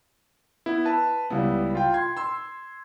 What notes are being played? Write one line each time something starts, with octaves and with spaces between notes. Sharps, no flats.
B3 E4
B4 A5
C#2 G3 B3 E4
F4 G5
C6 G#6
C6 E6